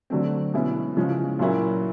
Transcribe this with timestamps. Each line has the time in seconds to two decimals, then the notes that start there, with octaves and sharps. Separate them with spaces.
0.10 D3 F#3 A3 C4
0.54 B2 G#3 C#4 E4
0.97 C#3 F3 G#3 C#4
1.39 A#2 F#3 A#3 C#4 E4